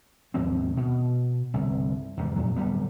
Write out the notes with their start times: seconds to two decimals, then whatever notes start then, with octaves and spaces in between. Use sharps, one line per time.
0.34 D#2 G#2 F3 C4
0.77 B2
1.54 G1 C2
2.17 E2 G#2 C3 D#3
2.36 F2 A#2 F#3
2.56 D1 E2 G3 B3